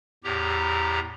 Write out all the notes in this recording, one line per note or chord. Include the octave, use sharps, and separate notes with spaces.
E2 A2 G4 A#5